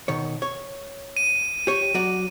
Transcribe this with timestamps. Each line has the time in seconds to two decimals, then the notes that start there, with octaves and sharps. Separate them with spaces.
0.08 B2 D#3 C#5
0.42 C#5
1.17 D#7
1.67 G4 C#5
1.94 F#3 F#4 D5